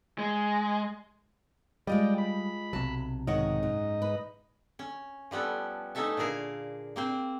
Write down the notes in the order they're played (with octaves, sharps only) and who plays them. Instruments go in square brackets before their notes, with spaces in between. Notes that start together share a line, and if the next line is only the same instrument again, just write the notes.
[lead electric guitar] G#3
[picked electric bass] G3 [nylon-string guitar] G#3 F4 D#5 [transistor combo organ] D5 G5
[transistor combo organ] B5
[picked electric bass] B1 C3 F#3 [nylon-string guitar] A5
[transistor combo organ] G#2 D#4 D#5 [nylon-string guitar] D#3 C#5 F#5
[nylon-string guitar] F#2
B4
[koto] C#4
F3 G3 B3 C#4 A4
A3 C#4 D#4 A4 E5 A5
A#2 D3 G#4 A#4 F5
A#3 C4 C5